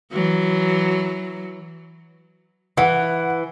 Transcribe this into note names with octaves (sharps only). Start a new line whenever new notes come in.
E3 F#3
E3 F#5